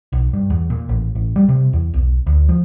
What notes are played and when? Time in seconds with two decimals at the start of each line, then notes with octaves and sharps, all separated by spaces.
0.13 B1
0.33 G2
0.50 E2
0.70 A#2
0.89 A1
1.15 A1
1.36 G3
1.49 C3
1.73 E2
1.94 B1
2.26 D2
2.49 F3